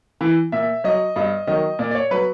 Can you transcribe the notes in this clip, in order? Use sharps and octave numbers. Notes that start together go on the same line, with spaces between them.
E3
A#2 E5
F#3 D#5
G2 D#5
D#3 F#3 D#5
A#2 D5
D5
C#5
F#3 B4